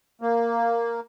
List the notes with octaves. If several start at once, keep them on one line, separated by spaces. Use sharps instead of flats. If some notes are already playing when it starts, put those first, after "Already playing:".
A#3